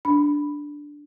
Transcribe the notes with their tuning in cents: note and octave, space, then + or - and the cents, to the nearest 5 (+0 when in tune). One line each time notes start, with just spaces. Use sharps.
D4 +0 B5 +0